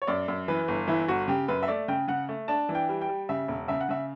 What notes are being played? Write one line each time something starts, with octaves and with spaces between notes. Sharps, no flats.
C#5
F#2 D5
F#2
E3 B4
G1
E3 E4
G1 F#4
C#3 G4
F#2 B4
E5
A3 D5
C#3 G5
C#3 F#5
A3
D4 A5
E3
G5
G3
G5
G3
C#3 E5
E1
C#3 E5
F#5
C#3 E5